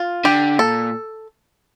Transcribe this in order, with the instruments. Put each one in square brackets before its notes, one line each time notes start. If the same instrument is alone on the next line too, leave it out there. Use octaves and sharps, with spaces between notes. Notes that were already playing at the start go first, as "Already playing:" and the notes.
Already playing: [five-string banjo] F4
[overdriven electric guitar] D3 [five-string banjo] G4
[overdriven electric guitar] A#2 [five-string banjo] A4